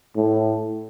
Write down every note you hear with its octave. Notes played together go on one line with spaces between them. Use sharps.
A2